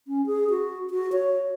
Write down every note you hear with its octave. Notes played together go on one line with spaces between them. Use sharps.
C#4
G#4
F#4
F#4
C#5